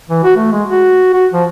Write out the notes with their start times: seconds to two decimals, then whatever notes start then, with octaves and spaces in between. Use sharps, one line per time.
0.09 E3
0.24 F#4
0.36 A3
0.52 G#3
0.69 F#4
1.13 F#4
1.33 F3